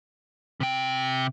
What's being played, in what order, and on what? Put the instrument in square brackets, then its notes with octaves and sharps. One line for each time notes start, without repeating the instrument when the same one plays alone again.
[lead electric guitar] C3 G5